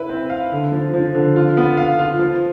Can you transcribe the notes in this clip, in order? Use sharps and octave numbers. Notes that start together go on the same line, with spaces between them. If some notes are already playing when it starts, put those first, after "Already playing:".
Already playing: E4 B4
C4
F5
D3
F3
F3
D3
F4
B3
F5
F4
F3